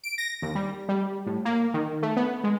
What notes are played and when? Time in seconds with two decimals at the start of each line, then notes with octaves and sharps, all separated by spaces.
0.04 D7
0.18 A#6
0.42 D#2
0.55 G3
0.89 G3
1.26 A2
1.45 A#3
1.74 D#3
2.03 A3
2.16 B3
2.44 G#3